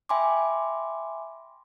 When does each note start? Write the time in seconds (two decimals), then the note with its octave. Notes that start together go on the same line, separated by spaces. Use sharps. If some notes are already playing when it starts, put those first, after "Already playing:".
0.09 E5 G5 G#5 B5 C6 D6